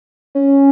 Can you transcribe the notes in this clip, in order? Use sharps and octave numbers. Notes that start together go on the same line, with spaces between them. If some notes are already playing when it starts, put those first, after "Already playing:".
C#4